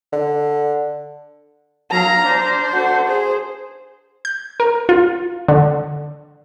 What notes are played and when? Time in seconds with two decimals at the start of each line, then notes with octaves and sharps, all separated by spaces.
0.12 D3
1.91 F#3 F5 A#5
2.23 D4 C5
2.74 F#4 A4
3.08 G#4 C5
4.25 G6
4.60 A#4
4.89 F4
5.48 D3